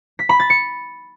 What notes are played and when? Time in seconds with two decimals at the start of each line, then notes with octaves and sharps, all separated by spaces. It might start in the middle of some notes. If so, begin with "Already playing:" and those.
0.19 B6
0.29 B5
0.40 A6
0.50 C#7